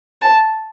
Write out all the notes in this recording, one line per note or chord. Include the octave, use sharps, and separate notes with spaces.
A5